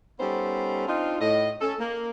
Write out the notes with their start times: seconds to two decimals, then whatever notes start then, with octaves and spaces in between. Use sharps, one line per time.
0.19 G3 B3 C#4 D#4 A4 C5
0.88 C4 D4 D#4 F4
1.20 A2 D#5
1.61 C#4 A4
1.79 A#3